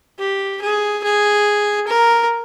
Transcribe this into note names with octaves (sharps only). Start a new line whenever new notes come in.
G4
G#4
G#4
A#4